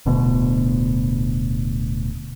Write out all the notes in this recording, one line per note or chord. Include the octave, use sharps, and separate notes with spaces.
D1 D2 B2